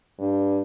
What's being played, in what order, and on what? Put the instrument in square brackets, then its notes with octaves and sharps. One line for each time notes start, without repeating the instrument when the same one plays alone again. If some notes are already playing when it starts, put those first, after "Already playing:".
[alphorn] G2